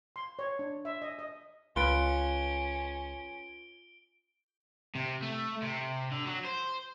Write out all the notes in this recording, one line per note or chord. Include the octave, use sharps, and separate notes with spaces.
C6
C#5
D4
E5
D#5
D#5
C#2 C#4 F4 B4 D7 G7
C3
A3
C3
D3
F#3
C5